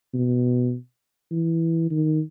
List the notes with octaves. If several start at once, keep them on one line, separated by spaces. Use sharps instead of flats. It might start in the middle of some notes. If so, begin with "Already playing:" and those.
B2
E3
D#3